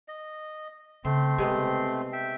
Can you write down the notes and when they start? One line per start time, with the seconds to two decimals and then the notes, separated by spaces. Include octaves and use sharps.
0.08 D#5
1.05 C#3 A3 C4 C6
1.38 C3 G#3 B3 D#4
2.13 E5 G5